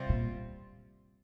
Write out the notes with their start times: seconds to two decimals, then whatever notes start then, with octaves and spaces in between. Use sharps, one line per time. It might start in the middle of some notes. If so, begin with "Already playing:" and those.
Already playing: C3 G3 C4 F4
0.09 A#2